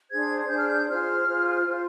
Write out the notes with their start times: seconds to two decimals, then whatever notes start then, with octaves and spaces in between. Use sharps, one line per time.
0.08 D4 G#4 C5 G#6
0.48 D4 G#4 C5 G6
0.57 F6
0.68 G6
0.88 F4 G#4 C5 F6
1.26 F4 G#4 C5
1.66 F4 C5